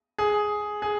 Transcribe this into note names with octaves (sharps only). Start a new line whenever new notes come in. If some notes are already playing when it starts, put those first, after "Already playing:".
G#4
G#4